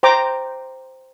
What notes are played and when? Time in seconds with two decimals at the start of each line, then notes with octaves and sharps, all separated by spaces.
0.03 C5 G5 A#5 D6